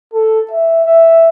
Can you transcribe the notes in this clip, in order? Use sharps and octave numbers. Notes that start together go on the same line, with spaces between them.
A4
E5
E5